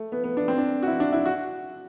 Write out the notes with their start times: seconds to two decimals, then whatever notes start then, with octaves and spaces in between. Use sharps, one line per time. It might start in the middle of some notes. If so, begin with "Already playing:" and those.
Already playing: A3
0.12 B3
0.24 B3
0.37 D4
0.48 C4
0.58 D4
0.83 F#4
0.87 E4
1.00 D4
1.13 E4
1.26 F#4